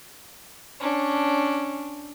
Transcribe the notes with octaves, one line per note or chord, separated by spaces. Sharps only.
C#4 D4